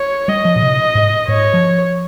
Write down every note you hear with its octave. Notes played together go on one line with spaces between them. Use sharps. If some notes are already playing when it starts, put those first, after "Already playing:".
Already playing: C#5
G3 D#5
F3
A#2
C3
G#2
G#2 C#5
F3